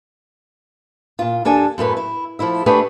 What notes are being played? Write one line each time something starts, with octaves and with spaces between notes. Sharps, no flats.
A#2 F4
D#2 D4 A4 G#5
F#2 A2 A3 B4
E4
F3 A3 E4 E5
A3 D4 G4 G#4 B4 C#5